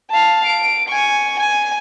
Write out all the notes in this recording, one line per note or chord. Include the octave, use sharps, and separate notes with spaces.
F5 A5
D7
G#5 C#6
G#5